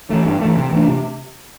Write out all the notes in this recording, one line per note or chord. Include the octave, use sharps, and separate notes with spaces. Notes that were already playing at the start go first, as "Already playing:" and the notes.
E3 A3
G2
E3 A3
C3
E3 A3 D4
C3